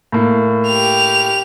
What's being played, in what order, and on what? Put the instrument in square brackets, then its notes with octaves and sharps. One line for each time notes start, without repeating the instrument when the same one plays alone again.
[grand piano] A2 A#3
[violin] G4 F7